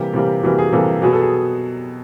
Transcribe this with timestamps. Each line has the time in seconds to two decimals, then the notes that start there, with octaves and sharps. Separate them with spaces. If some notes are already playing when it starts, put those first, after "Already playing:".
Already playing: C3 E3 G3 A#3 G4
0.13 C3 E3 G3 A#3
0.43 C3 E3 G3 A#3 F#4
0.59 G#4
0.73 C3 E3 G3 A#3 A4
1.02 B2 F#3 B3 G#4
1.13 A4
1.22 G#4